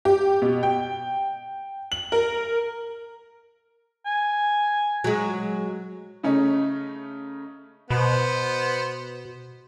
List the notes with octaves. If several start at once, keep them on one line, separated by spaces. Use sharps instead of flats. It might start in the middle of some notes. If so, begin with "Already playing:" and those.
G4
B2
G5
F#7
A#4
G#5
F#3 G#3
C#3 A3 C#4 D#4
B2 B3 C5